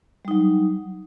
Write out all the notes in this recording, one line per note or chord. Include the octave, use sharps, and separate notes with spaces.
F#3 G3 D#4